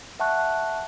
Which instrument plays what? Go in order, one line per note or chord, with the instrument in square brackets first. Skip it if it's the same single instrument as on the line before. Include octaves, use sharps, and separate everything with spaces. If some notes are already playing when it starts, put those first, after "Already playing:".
[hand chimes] E5 F#5 A5 C#6 F#6